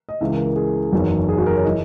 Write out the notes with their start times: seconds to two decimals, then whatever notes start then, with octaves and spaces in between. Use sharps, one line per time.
0.09 D#5
0.21 C#2 C#3 E3 E5
0.32 A#4
0.45 A#4
0.56 G#4
0.92 F#1 E2 D#3 F#3
1.29 G#4
1.38 F#4
1.46 A#4
1.56 C#5
1.64 E3 D#5